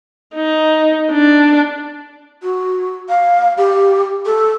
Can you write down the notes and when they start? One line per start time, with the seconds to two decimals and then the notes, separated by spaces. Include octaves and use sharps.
0.35 D#4
1.11 D4
2.43 F#4
3.09 F5
3.57 G4
4.26 A4